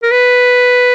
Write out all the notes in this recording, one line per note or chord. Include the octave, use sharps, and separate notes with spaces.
A#4
B4